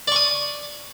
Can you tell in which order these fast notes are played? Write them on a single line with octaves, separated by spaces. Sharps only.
D5 C#6 D#6